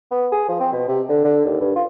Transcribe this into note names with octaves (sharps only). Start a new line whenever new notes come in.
B3
G#4
F3
C4
B2
C3
D3
D3
D#2
G2
F4